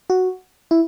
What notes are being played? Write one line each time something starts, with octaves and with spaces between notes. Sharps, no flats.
F#4
E4